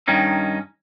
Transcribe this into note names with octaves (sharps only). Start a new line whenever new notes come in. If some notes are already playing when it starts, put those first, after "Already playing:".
G2 D#3 C#4 D#4